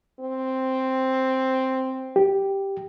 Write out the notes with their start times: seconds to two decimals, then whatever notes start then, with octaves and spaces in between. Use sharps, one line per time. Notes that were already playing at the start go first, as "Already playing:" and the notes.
0.20 C4
2.16 G4